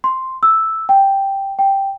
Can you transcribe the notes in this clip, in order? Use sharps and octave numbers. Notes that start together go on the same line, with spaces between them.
C6
E6
G5
G5